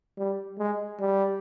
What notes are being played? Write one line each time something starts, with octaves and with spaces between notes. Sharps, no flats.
G3
G#3
G3